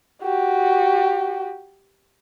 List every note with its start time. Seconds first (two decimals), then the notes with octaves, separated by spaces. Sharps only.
0.23 F#4 G4